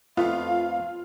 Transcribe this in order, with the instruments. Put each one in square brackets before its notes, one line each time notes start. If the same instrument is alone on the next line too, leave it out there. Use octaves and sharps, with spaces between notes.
[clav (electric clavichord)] F2 A3 B3 [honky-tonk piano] F4 [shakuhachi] F5